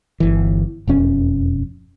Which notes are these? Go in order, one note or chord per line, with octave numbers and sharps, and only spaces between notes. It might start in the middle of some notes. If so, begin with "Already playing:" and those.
G1 E3
E1 F2 C#4